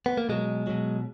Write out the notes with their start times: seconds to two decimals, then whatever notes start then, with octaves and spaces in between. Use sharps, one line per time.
0.06 B3
0.17 A#3
0.29 B2 F#3 G#3
0.67 B2 F#3